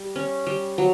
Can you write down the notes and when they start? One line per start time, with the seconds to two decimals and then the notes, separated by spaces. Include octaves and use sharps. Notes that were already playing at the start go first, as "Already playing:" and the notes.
Already playing: G3
0.16 C#4
0.47 G3
0.78 F#3